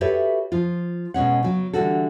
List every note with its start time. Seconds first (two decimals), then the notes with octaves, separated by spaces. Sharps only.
0.01 F#4 G4 A4 B4 C#5 E5
0.52 F3 F4
1.14 B2 G#3 C#4 F#5
1.43 C#3 F#3
1.73 D3 E3 F3 G3 F#4 A4